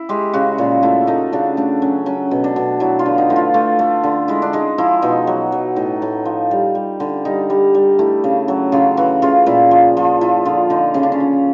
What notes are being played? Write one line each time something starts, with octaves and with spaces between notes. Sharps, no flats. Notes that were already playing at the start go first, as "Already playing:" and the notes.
Already playing: E4
G#3 G4
C#3 F#4
A#2
A3 E4
A3 D#4
C#3 D4
A3 D4
F#3 C#4
F#3 C#4
B2
D4
B2
F#3 E4
F4
D3
D#4
A3 E4
F4
A3 F4
A3
D3
G#3 E4
D4
G#3 D#4
F3 E4
B2 D#4
F#3
F#3
A2 D#4
A2
F3
G3
G3
D3
G3 D#4
G3
G3
A3 E4
C#3
F#3
C#3 F4
E3 F#4
C#3 F4
A#2 E4
F3
F3
F3 E4
D3 F4
D3 D#4
C#3 C#4
D4
C#4
F3